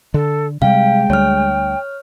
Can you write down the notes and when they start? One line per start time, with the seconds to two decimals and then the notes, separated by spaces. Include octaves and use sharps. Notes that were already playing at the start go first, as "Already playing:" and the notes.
0.14 D3 A4
0.62 C3 G3 G#3 F5 G5
1.10 D2 G3 C#5 F6